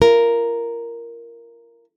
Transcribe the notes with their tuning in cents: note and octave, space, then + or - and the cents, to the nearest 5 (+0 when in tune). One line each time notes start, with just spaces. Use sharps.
F4 -45 A#4 +0